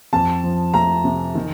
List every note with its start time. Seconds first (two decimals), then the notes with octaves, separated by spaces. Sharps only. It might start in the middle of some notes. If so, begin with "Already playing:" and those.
0.13 F2 A5
0.44 F3
0.74 A3 A#5
1.04 C3
1.35 D#3